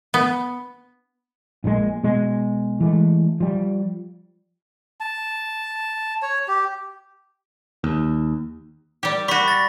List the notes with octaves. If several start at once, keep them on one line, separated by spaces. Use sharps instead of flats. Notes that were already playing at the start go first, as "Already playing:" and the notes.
B3
A#1 A#2 D#3 G#3
B2 G#3
E3 G#3 A3
F3 G3
A5
C#5
G4
D#2
G3 G4
G3 F#4 B5 C#6 B6
A6 A#6